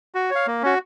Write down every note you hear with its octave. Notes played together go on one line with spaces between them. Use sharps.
F#4
C#5 F5
A#3
C#4 F#4